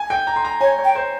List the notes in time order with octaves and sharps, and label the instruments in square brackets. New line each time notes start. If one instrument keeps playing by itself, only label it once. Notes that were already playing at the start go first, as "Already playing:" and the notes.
Already playing: [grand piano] G#5
G5
A#5
C6
A#5
[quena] C#5 [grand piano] G#5
[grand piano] C#5
[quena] G5
[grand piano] C5